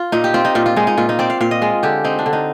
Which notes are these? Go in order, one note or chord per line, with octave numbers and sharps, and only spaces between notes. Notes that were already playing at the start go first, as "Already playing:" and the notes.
Already playing: F4
A#2 D#4
G4
C4 F4
D#4
A#2 F4
F4
G#3 D#4
D#4
A#2 F4
D#4
C4 D5
F5
A#2 F5
D#5
G#3 F4
D3 G4
C4 D#4
D4
D3
D#4